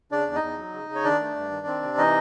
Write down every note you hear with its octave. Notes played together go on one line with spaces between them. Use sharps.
C#3 D4 D5
E2
D#4 D#5
E2
F#3
C#3
C#3
C#5
D#3 D4 D5
A3
G2
D#3
C4
C3
E3 D#4 D#5